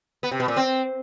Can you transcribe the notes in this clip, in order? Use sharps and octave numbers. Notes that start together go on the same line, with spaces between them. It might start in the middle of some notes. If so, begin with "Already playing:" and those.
B3
C3
B2
A#2
C4